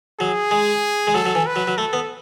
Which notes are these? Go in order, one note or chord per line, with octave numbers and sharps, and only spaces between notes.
F#3 G#4
G#3
G#3
F#3 A4
F#3
E3
B4
F#3
F#3
A3 A4
B3